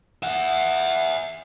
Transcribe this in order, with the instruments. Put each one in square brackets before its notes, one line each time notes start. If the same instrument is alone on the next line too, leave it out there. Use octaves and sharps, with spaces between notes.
[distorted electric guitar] E5 F#5